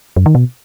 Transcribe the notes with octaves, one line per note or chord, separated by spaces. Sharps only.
F#2
D#3
B2